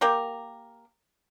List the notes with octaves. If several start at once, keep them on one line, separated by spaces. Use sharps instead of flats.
A#3 G4 A#4